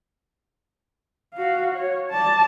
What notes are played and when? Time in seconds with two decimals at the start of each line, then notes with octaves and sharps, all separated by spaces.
1.35 F#4 F5
1.75 C#5
2.11 D5 A5